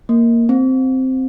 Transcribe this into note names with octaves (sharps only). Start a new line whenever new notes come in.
A#3
C4